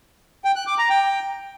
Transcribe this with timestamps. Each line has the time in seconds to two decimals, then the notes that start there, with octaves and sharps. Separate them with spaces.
0.44 G5
0.56 F#6
0.67 D6
0.78 A#5
0.90 G5